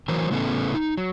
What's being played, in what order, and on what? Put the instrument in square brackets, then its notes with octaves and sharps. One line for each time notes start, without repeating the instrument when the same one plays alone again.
[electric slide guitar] E3 F#3 A#4 C5
A2 C#3 A3 B3 C#4 A4
D#4
F#3